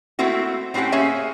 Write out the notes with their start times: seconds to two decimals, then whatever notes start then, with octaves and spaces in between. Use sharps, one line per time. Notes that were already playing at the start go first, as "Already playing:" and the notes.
0.19 A3 A#3 C4 E4 F#4
0.74 A2 C4 C#4 G4 F#5
0.92 A#3 C#4 G#4 C#5 E5